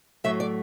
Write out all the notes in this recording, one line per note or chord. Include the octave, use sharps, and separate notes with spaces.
A2 F#3 A3 E5
D5